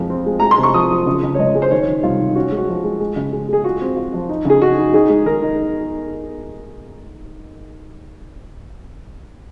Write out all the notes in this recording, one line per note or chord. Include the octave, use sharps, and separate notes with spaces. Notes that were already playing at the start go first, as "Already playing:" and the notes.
Already playing: F2 F3 G#3
C4
G#3
G#3 A#5
C6
C3
C#6
F3 D#6
F3
C#3
C#3
C#5
C#2 D#5
G#3
C5
D#3 C#5
D#3
C2 F4
D#3
C#4 F#4
G#3
F#4
F3
G#3
G#3
C#3
G#3
G#3 G#4
F4 F#4
C4
F4
F3
D#4
C#3 G#4
D#4 F#4
D#4
D#4 G#4
G#3
D#3 A#4
D#4